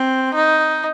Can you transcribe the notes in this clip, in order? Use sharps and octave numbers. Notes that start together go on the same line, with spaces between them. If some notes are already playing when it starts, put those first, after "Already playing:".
Already playing: C4
D#4